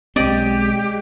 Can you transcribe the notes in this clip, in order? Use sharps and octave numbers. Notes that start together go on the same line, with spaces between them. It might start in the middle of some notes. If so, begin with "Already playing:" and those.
B1 G#3 C4 G4 D5 D#5